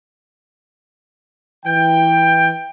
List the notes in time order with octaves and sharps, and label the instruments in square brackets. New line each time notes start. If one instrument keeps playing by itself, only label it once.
[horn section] E3 G5